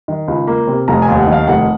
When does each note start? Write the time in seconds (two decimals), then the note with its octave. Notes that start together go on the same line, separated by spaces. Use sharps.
0.08 D#3
0.28 C#2
0.47 A#3
0.67 C3
0.88 F1 A#5
1.02 G#5
1.08 D#2
1.18 F#5
1.27 D#3
1.33 F5
1.47 F1 F#5